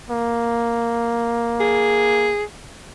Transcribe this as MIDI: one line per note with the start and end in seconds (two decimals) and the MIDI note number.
0.10 2.35 58
1.60 2.44 68